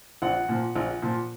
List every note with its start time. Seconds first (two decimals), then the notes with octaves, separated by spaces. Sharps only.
0.22 A#1 F#5
0.49 A#2 F3
0.76 A#1
1.02 A#2 F3